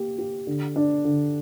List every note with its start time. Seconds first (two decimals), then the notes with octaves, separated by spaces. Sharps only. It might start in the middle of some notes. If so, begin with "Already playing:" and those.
Already playing: A#3 G4
0.18 G4
0.47 D3
0.76 D4
1.05 D3